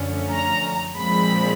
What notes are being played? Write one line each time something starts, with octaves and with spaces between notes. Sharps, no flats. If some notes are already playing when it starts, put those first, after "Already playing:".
Already playing: F#2 D3 F3 A3 C#4
A#5
A#2 F3 G#3 C4 B5